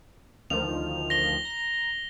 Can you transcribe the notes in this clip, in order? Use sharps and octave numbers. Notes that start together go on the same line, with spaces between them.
D2 D#3 F3 F7
A#6 G7
A#5